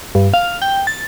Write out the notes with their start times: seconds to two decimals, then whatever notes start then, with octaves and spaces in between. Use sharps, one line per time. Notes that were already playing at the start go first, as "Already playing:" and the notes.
0.15 G2
0.34 F5
0.62 G5
0.87 A6